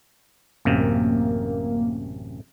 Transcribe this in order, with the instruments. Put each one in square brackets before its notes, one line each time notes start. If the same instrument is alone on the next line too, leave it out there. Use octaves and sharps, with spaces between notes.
[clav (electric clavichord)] A1 F#2 C3 [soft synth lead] A#3